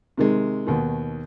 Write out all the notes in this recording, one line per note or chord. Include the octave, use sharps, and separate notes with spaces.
C3 D#3 G#3
D#2 B2 D#3